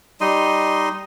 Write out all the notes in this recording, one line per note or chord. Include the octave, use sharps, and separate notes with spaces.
G3 D#4 D#5 C6